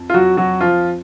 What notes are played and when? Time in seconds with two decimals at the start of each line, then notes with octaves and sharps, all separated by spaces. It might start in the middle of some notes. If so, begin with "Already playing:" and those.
Already playing: F2
0.10 F4
0.14 F#3 F#4
0.37 F#3 F#4
0.61 F3 F4